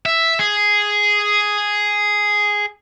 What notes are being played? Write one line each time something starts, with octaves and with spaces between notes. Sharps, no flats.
E5
G#4